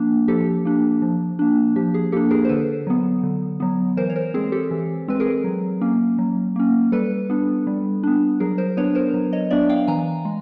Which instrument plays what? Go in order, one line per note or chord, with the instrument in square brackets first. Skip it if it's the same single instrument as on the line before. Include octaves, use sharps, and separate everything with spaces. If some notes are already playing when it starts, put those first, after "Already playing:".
Already playing: [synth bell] F3 A#3 D4
F3 G4 A4
A#3 D4
F3
A#3 D4
F3 G4
G#4
A#3 G4 A4
D4
G#4 A#4
C5
D3 A4 B4
F#3 B3
D3
F#3 B3
E3 A#4 C5
C#5
A#4 C5
G#3 C4 G#4 A#4
G4 A4
E3
G#3 C4 B4
G#4 A#4
F#3
A#3 C#4
F#3
A#3 C#4
G3 A4 B4
B3 D4
G3
B3 D4
F#3 G#4 A#4
A#4 C5
B3 D4 B4 C#5
A#4 C5
F#3
C#5 D#5
B3 D4 D5 E5
F5 G5
E3 G#5 A#5
G#3